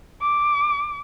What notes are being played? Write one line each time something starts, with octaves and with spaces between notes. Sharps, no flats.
D6